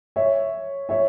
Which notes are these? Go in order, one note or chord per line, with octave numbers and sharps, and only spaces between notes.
C#5 E5
C#5 E5